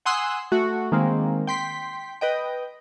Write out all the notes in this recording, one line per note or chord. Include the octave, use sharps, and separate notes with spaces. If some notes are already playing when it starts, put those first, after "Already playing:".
F#5 G#5 C6 D#6 E6 F#6
A3 F#4
D#3 G#3 A#3 C4
G5 C6 B6
B4 D#5 G5